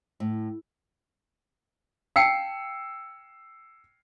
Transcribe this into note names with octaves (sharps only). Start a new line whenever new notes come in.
A2
F5 G5 A5 E6 C7 C#7